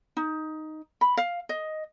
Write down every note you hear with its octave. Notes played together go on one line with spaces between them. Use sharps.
D#4
B5
F5
D#5